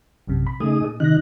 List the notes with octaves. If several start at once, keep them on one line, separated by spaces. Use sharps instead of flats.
A#1 F#2 C3
B5
C#3 A3 D#4 G#4 D#6
A#2
C3 D#3 D#4 F#6 A#6